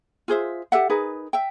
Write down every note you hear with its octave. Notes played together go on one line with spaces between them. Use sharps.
F4 G#4 C5 E5
G4 A4 E5 F#5
D#4 G#4 A#4 B4
E5 G5